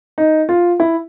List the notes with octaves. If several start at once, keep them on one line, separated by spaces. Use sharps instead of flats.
D#4
F4
E4